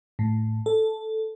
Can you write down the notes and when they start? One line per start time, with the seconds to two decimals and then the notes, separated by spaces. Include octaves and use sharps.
0.19 A2
0.66 A4